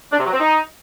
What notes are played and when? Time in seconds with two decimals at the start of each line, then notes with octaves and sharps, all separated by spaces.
0.12 D4
0.19 C3
0.26 F#3
0.33 C4
0.40 D#4